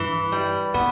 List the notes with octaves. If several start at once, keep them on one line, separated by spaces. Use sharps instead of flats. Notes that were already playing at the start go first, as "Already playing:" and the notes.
Already playing: G2 E3
G3
A#2 B3